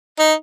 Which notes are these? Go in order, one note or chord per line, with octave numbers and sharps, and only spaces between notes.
D#4